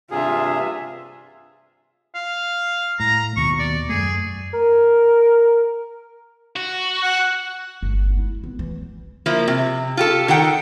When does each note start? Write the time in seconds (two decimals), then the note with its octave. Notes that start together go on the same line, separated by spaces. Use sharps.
0.11 G2 C3 F4 G#4 E5
2.15 F5
3.00 A2 A#5
3.37 D#2 B2 C#6
3.59 D5
3.89 F#2 A3 G#4
4.53 A#4
6.56 F#4
7.03 F#5
7.83 G1
8.17 E4
8.44 B3
8.59 E3
9.26 F3 A#3 E4
9.48 C3
9.97 F4 G4 A4
10.28 D#3 A4 F#5 G5